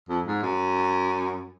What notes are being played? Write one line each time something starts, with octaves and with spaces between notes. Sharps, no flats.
F2
G#2
F#2